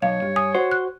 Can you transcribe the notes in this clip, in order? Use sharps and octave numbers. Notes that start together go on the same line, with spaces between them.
B1 C#5 F5
G2
G#5 D#6
F#4 C5
F#6